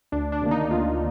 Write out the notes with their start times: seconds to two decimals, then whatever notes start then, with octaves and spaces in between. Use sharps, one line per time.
0.12 D2 D4
0.32 D4
0.41 C3 D#3 A#3
0.51 D#4
0.70 D2 F4